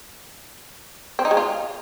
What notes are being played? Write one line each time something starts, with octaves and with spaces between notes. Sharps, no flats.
C4
D#4
G#3
F4